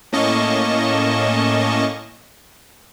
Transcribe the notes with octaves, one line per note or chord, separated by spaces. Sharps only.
A2 A#3 C#4 D#5 A5 C#6